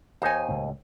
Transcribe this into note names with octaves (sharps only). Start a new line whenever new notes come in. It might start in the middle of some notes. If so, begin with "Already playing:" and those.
D#2 D#4 C5 C#5 G#5
C#2 A2